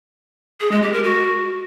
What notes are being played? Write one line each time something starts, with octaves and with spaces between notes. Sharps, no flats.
G#4
G#3
G4
A#4
F#4